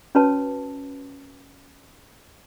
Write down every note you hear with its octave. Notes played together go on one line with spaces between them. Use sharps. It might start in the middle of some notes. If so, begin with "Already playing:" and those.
C#4 F#4 B4 C#5 A5